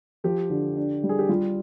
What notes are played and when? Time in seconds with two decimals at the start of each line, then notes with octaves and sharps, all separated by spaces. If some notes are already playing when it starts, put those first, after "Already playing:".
0.24 F3 G4
0.50 D3
0.77 D4
1.04 G3
1.09 G#4
1.19 G4
1.29 G3 F4